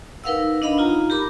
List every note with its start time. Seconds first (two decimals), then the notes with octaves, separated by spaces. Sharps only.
0.24 D#4 A#4 B4 F5 F#5 E6
0.62 D4 D#5 F5 B5
0.78 D#4 F4 A#5
1.10 G4 A#4 B5 D6